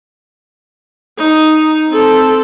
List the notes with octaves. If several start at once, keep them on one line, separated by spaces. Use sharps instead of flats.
D#4
C4 A4